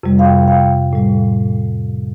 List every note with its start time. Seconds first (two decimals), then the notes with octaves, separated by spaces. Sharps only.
0.03 F2 C3 G3
0.19 F5
0.26 G5
0.48 F5
0.93 A2 G3